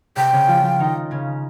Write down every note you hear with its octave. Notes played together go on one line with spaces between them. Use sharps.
C3 C4 G5
C#3 C#4
F3 F4
F3 F4
D#3 D#4
C#3 C#4